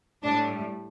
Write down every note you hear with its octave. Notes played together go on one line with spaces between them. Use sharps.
A2 G3 D4